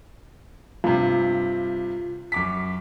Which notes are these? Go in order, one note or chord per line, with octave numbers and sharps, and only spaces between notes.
G2 C3 F4
F#2 D6 B6